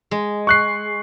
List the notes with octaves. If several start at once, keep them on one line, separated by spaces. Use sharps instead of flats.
G#3
C#6 F#6 C7